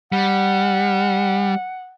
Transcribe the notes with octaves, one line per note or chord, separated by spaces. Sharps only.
G3 F#5